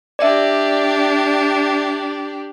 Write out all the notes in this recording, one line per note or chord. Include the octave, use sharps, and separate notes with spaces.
D4 G4 D5 E5